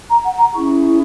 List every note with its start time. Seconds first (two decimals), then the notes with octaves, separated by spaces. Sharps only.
0.09 A#5
0.23 F#5
0.38 A#5
0.53 C#4 E4 G#4 C#6